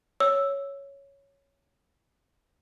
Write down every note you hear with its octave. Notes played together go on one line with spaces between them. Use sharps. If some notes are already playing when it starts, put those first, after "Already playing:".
C#5 E6